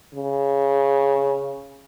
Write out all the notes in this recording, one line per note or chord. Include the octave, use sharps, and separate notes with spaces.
C#3